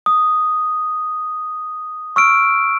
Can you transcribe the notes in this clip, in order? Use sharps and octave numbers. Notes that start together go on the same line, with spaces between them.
D#6
C#6 E6 F6 D7